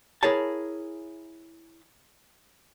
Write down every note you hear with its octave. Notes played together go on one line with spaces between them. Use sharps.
E4 G#4 A#4 C#5 A5